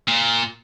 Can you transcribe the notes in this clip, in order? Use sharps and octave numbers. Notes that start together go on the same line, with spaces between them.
A#2